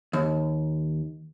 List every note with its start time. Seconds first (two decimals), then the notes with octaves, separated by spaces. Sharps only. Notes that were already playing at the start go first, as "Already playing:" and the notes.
0.13 D#2